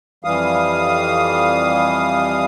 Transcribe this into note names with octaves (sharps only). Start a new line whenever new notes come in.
F2 E3 G3 F5 D#6